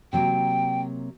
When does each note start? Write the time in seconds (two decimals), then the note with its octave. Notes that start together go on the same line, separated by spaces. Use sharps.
0.13 C3 F#3 A#3 G5